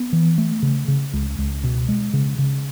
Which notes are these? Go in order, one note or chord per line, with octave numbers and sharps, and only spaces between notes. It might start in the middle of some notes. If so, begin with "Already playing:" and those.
Already playing: B3
E3
A3
C#3
C#3
C#2
C#2
B2
G#3
C#3
C#3